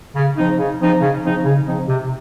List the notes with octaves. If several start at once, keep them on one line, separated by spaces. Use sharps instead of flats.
C#3
F3 C4 D#4
C#3
F3 C4 D#4
C#3
F3 C4 D#4
C#3
F3 C4 D#4
C3